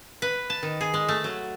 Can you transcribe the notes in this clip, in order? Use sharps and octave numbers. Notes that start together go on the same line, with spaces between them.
B4
A5
D#3
G#4
G#3
A3
F#3